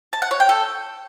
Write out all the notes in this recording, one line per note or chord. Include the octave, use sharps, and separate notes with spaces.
A5
F#5
C#5
G5
A4